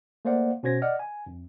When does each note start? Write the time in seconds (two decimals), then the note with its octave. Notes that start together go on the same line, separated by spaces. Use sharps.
0.25 A3 A#3 C5 D5 F5 F#5
0.63 B2 C#4 F#4 C5 G#6 A#6
0.82 D5 D#5 F#5 F6
0.99 G#5
1.26 F2